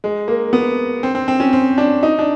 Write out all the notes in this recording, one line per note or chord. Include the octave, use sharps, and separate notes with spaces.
G#3
A#3
B3
C4
C4
C4
C#4
C4
D4
D#4
D4